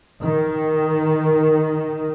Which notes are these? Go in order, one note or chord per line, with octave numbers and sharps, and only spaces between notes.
D#3